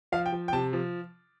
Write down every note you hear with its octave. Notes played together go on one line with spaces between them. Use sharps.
F3 F5
G5
F3
G5
C3 A5
F3